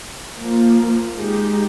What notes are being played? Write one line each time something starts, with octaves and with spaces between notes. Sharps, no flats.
F3 A#3 F4
G#3 D#4 G4